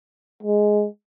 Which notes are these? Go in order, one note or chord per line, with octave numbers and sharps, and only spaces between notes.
G#3